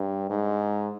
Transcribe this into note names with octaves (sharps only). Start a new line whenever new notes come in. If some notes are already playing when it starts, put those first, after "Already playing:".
Already playing: G2
G#2